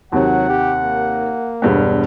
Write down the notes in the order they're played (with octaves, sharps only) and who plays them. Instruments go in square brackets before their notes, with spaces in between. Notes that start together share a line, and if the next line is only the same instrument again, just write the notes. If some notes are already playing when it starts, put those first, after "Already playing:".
[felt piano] D#2 C3 [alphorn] F#3 [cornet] F#5
[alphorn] G4
A#3
[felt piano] E1 G2 B3